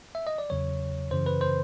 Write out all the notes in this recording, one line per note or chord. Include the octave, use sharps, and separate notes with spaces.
E5
D#5
D5
E2 C#3 F#3 C#5
F#2 C#3 E3 C5
B4
C5